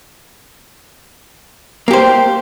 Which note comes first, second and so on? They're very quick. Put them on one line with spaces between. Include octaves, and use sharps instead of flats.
A#3 G4 C5